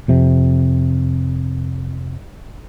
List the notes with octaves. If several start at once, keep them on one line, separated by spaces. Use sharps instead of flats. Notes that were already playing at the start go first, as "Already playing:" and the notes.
F2 C3